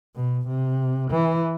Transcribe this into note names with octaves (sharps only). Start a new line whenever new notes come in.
B2
C3
E3